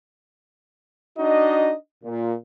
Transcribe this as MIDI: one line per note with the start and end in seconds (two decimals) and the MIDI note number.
1.18 1.73 62
1.18 1.73 63
1.18 1.73 66
1.18 1.73 75
2.04 2.33 46